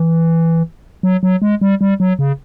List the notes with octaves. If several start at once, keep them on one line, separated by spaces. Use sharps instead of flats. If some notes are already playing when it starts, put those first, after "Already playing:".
Already playing: E3
F#3
F#3
G#3
G3
G3
F#3
C#3